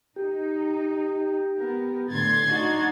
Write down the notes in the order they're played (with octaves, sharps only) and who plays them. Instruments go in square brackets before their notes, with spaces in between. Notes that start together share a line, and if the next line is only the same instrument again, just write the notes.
[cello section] D#4 [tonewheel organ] G4
[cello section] B3 A#4
[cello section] A2 D3 [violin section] C6 G#6 A6
[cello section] D4 D#4 F#4